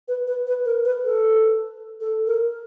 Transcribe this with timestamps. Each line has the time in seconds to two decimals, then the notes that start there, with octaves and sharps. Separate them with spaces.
0.08 B4
0.27 B4
0.47 B4
0.65 A#4
0.85 B4
1.04 A4
2.01 A4
2.27 A#4